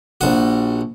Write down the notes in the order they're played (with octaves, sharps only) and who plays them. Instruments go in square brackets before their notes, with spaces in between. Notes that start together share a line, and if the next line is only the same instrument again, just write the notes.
[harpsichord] A#1 F#4